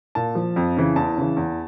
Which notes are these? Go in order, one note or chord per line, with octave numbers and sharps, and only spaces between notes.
A#2 A5
F3
F2
C#3 E3
E2 A5
C#3 E3
E2